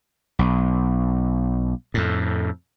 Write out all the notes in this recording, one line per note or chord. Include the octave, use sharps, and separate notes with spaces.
B1
F2 A2